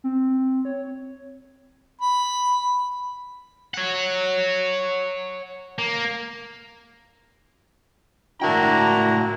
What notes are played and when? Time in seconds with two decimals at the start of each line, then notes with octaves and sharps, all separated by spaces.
0.04 C4
0.65 C#5
2.01 B5
3.74 C#5 F#5
5.78 A#3
8.42 A2 D4 E4 F#4 A#4 G5 A#5